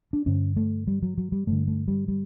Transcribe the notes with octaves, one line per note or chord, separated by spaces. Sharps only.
D4
G2 D3 C#4
A3
G3
F#3
F#3
G3
G2 D3 A3
A3
G3
G3